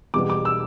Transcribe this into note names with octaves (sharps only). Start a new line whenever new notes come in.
E2 B2 G3 B3 D6
D6
E6